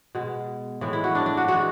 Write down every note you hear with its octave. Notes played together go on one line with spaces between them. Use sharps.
B2 G#3
A2 E3 G#3
E4
F#4
D4
D4
F#4
E3 G#3 F#4